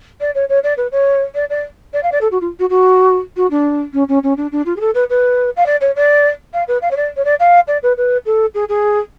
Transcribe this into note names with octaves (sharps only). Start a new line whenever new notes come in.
D5
C#5
C#5
D5
B4
C#5
D5
D5
D5
F5
D5
A4
F#4
F4
F#4
F#4
F#4
D4
C#4
C#4
C#4
D4
D4
F4
G#4
A4
B4
B4
F5
D5
C#5
D5
F5
B4
F5
C#5
D5
C#5
D5
F5
D5
B4
B4
A4
G#4
G#4